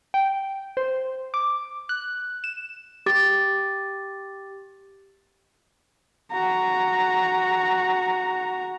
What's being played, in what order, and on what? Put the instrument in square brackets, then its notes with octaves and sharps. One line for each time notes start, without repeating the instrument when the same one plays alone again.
[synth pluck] G5
C5
D6
F#6
E7
[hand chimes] G4 D6 A6
[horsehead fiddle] F#4 A#5